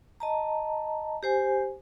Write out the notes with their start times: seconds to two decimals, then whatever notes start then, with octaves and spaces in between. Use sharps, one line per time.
0.20 D#5 A5 A#5
1.23 G4 C5 G#5